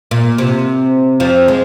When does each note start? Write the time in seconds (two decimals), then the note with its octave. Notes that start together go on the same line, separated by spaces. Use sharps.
0.11 A#2
0.38 C3
1.20 F2 F3
1.48 G#3